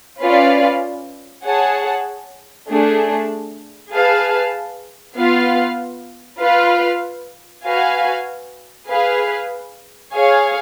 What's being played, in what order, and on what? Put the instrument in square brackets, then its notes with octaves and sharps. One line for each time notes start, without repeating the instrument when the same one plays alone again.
[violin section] C#4 F4 B4 D5 F5
G#4 C#5 F#5 A5
A3 D4 G#4
G#4 B4 F5 A5
B3 F4 B4 F5
F4 B4 F5
F#4 B4 F5 G#5
G#4 B4 F5
G#4 C#5 F5 G#5